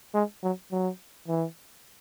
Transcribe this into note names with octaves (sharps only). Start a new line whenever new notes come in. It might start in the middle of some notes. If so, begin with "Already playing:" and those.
G#3
F#3
F#3
E3